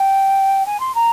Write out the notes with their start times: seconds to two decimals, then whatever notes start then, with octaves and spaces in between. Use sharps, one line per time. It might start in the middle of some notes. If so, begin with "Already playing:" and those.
Already playing: G5
0.66 G#5
0.80 C6
0.95 A#5